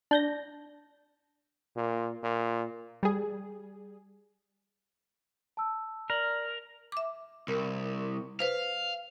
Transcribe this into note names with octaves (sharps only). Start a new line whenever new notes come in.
D4 G6 A#6
A#2
A#2
G3 G#4
A5 E6
A#4 D5 A#5 F#7
E5 D6
C2 A#4
B4 C5 F5